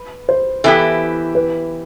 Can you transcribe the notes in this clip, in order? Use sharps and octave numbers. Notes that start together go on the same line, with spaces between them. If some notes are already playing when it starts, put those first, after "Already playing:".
Already playing: B4
C5
E3 B3 E4 G4 A4
B4